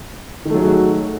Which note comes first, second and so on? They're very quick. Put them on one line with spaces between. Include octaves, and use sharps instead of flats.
D#3 A3 F#3 G#4 F#4